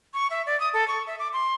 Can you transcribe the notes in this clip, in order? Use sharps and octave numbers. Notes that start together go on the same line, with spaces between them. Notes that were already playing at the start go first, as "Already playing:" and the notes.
C#6
E5
D5
D#6
A4
C#6
E5
D6
C6